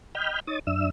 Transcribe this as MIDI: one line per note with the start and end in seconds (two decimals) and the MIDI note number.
0.15 0.40 75
0.15 0.40 79
0.15 0.40 83
0.15 0.40 89
0.15 0.40 91
0.47 0.59 63
0.47 0.59 73
0.47 0.59 87
0.47 0.59 93
0.67 0.90 42
0.67 0.90 62
0.67 0.90 76
0.67 0.90 88